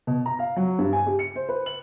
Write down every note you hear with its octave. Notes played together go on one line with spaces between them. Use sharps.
B2
A#5
F5
F#3
G2
G#5
G4
C#7
C5
B4
F#7